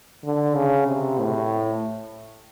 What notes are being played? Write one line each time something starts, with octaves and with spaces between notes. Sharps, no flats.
D3
C#3
C3
A2